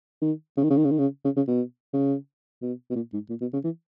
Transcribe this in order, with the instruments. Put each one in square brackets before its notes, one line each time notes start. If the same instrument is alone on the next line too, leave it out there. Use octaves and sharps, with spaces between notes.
[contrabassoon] D#3
C#3
D#3
C#3
D#3
C#3
D#3
C#3
C#3
C#3
B2
C#3
B2
B2
A#2
G#2
A#2
B2
C#3
E3